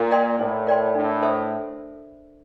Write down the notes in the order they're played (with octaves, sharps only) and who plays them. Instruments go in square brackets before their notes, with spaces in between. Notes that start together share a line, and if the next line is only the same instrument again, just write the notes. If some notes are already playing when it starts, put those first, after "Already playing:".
Already playing: [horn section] A#2
[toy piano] A#4 D5 G5 C6
[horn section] A2 [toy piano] E4
[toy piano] A#4 D5 G5 C6
[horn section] A2 [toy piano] D4
[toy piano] A4 C5 E5